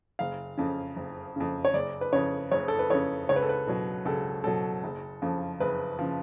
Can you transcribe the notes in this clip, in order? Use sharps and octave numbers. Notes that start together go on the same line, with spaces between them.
F#1 F5
F2 C#3
F#1
F2 C#3
C#5
F#1 D5
B4
F2 C#3 C#5
F#1 C#5
A4
B4
F2 C#3 C#5
C#2 C#5
B4
A4
B4
B2 F#3
C#2 A4
B2 F#3 A4
F#1
F2 C#3 F3
F#1 B4
C#3 F3